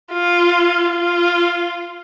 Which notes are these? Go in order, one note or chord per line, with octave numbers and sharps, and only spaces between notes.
F4
F4